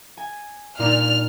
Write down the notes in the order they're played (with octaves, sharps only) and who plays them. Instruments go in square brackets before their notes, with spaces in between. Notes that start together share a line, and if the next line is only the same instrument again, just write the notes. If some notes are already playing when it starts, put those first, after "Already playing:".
[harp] G#5 D#7
[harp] A#2 D4 D#4 [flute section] D5 [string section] F6